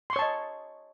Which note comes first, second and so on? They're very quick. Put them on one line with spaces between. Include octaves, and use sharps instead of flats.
C6 C#6 C#5 A5 D#5